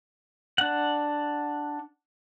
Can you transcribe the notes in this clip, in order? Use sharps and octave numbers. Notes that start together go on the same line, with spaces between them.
D4 F#5